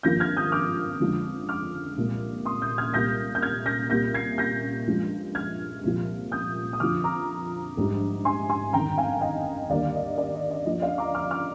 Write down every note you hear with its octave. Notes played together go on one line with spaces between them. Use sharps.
G#1 G2 F3 A#3 G6 A#6
F6 G#6
D#6 G6
D6 F6
F2 D3 F3 G#3
D6 F6
C2 A#2 G#3
C6 D#6
D#6 G6
F6 G#6
C2 A#2 G3 A#3 G6 A#6
G6
F6 G#6
G6 A#6
C2 A#2 G3 A#3 G6 A#6
G#6 C7
G6 A#6
G2 F3 G#3
F6 G#6
C2 A#2 F3
D#6 G6
D#6
F2 D3 F3 D6 F6
A#5 D6
A#1 G#2 G3
G#5 C6
G#5 C6
G1 F2 D#3 G5 A#5
F5 G#5
D#5 G5
D#2 D3 G3 A#3 D5 F5
D#5
D5
D#5
D#5
G2 F3 A#3 D#5
D5 F5
A#5 D6
D6 F6
D6 F6